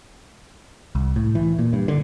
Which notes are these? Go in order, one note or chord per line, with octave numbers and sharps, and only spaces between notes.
C2
A2
E3
A#2
G2
D3